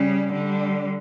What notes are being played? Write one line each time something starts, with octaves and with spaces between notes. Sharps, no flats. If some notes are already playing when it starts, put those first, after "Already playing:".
Already playing: C#3 G3
D3 G3